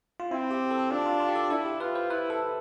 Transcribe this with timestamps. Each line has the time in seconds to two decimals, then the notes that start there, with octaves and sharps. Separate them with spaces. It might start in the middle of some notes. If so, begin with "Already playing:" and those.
0.20 F4
0.31 C4 E4
0.51 G4
0.71 A4
0.91 D4 F4
1.06 F4
1.20 F4
1.29 G4
1.35 A4
1.50 E4 A4
1.65 G4
1.80 F4 B4
1.95 C5
2.10 E4 B4
2.30 A4